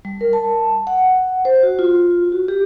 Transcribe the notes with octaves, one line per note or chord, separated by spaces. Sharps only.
G3
A#4
A5
F#5
C5
F#4
F4
F#4
G4